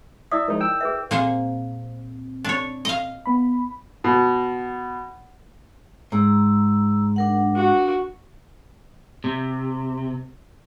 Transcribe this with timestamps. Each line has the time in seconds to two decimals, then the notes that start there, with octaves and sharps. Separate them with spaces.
0.31 E4 D5 E5 D#6
0.48 F3 G#3 D#4 A#4
0.60 G5 E6
0.81 G#4 B4 E5
1.11 A#2 A#3 C4 G#4 C5
2.44 D4 C#5
2.85 D#5 F5
3.26 B3 B5
4.04 B2
6.12 G#2 A#5 E6
7.16 D4 A#4 F#5
7.56 F#4
9.24 C3